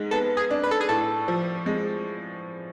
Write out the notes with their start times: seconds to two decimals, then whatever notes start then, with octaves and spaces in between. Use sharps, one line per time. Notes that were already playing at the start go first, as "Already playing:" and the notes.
Already playing: G#2 G#3
0.11 B3 A4
0.37 G#4
0.51 D4
0.63 B4
0.71 A4
0.81 G#4
0.89 A2 A4
1.28 F3
1.66 G#3